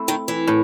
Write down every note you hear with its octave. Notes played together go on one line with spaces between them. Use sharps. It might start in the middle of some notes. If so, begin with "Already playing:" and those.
Already playing: A3 C4 E4
D#3
E3
A2